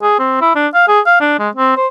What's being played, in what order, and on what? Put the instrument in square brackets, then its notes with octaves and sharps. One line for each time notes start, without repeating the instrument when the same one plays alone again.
[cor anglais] G#4
C4
E4
D4
F5
G#4
F5
D4
G#3
C4
C5